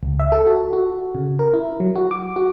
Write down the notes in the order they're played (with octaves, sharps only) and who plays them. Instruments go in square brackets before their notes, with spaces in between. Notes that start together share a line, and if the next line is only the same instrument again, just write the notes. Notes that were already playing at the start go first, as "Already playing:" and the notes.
[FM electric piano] C#2
E5
A4
F#4
F#4
C#3
A#4
E4
F#3
F#4
D6
F#4